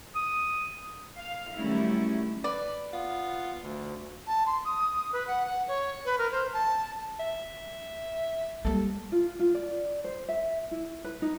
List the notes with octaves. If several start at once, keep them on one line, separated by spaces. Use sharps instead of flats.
D#6
F5
D#3 F#3 G3 A3 C#4 E4
B4 D5
B3 F4
D2
A5
C6
D#6
B4
F#5
F#5
C#5
B4
A#4
C5
A5
E5
G3 A#3 A4
F4
F4
D5
C5
E5
E4
B4
D#4